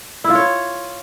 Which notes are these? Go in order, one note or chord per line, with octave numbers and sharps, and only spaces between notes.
E4
F4
C#5